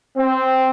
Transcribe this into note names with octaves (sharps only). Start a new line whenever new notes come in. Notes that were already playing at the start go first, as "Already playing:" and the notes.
C4